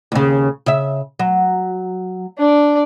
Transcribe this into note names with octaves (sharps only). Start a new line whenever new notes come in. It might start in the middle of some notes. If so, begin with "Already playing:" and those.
D#2 C#3
C#3 E5
F#3
D4 D5